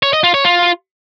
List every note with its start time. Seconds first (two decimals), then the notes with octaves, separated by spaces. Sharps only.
0.03 C#5
0.13 D#5
0.24 F4
0.34 C#5
0.45 F4